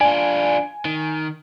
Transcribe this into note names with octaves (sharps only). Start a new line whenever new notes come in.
D4 F4 G#5
D#3